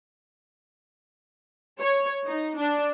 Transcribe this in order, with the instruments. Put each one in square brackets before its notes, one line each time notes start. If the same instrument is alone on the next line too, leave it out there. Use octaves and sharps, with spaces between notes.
[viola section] C#5
D#4
D4